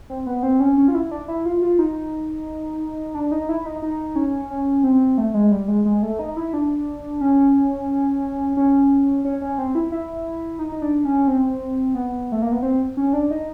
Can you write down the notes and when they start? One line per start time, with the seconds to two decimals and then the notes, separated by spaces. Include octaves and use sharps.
0.10 C4
0.26 B3
0.43 C4
0.60 C#4
0.77 C#4
0.88 F4
0.94 E4
1.11 D4
1.28 E4
1.46 F4
1.62 F4
1.79 D#4
3.15 D4
3.32 D#4
3.49 E4
3.66 D#4
3.82 D#4
4.16 C#4
4.50 C#4
4.84 C4
5.18 A3
5.34 G#3
5.52 G3
5.68 G#3
5.85 G#3
6.03 A3
6.19 D#4
6.37 E4
6.53 D4
7.21 C#4
8.57 C#4
9.25 C#4
9.42 C#4
9.58 C4
9.75 E4
9.92 E4
10.59 D#4
10.72 D#4
10.82 D4
11.05 C#4
11.28 C4
11.95 B3
12.32 A3
12.42 A#3
12.52 B3
12.63 C4
12.97 C#4
13.13 D4
13.31 D#4